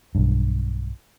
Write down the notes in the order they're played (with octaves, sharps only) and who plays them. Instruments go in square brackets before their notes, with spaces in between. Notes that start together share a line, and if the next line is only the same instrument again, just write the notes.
[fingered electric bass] B1 G2